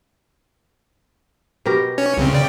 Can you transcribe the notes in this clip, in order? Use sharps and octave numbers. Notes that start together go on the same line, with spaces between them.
B2 G4 A#4
C#4 C#5
C2 C#3 C4
C#3 D5 G5